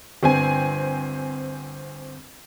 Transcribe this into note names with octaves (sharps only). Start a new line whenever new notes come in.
G1 C4 G#5